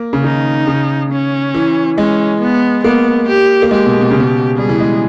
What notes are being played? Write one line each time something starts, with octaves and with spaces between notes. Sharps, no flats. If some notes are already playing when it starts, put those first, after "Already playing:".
Already playing: A#3
C#3
D#3 D#4
C#3
C#4
E3
G#3 C#4
B3
A#3 B3
G4
A#3
G#3 G4
B2
B2
C#3
B2
G3 G#4
E3
G#3